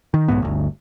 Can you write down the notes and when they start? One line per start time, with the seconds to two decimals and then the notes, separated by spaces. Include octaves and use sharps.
0.14 D#3
0.28 B1 F2 G#2 B3
0.42 G1 D2